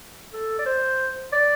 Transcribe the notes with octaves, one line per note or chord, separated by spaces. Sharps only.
A4
D5
C5
D5